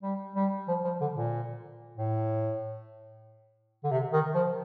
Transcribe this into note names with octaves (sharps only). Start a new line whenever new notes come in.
G3
G3
F3
F3
D3
A#2
A2
D3
C3
D#3
F3